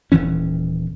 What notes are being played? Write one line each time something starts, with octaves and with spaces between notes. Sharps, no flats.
D#1 D#3 E3 C#4